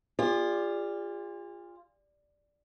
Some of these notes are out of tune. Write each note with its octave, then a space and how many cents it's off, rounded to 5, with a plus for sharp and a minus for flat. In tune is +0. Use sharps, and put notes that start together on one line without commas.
F4 +0 G#4 -40 D5 +0